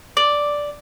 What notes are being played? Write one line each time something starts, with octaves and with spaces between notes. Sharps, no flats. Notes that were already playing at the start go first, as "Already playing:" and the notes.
D5